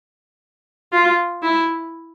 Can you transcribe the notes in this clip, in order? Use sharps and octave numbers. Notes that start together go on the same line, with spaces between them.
F4
E4